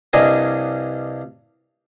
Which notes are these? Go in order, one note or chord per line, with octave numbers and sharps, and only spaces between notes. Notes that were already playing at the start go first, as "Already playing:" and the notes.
C2 G2 D4 D#5 G#5